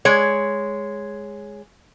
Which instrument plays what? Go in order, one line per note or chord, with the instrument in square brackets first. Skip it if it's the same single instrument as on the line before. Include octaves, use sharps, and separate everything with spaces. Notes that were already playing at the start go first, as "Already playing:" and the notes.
[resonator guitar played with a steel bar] G#3 C#5